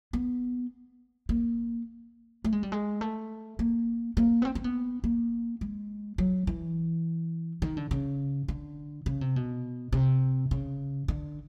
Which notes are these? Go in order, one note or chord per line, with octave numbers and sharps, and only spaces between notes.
B3
A#3
A3
G#3
G3
G#3
A3
A#3
A#3
B3
C4
C4
B3
A#3
G#3
F#3
E3
D#3
D3
C#3
D3
C#3
C3
B2
C3
C#3
D3